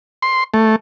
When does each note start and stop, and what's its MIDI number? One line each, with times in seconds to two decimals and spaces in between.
0.22 0.44 84
0.54 0.76 57